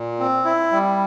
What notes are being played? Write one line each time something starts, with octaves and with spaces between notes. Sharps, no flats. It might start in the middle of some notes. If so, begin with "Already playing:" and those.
Already playing: A#2
C4
E4
G3